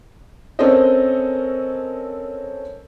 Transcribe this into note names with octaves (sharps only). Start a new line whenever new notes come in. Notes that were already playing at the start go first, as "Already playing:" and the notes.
C4 C#4 A4 A#4 C5 D#5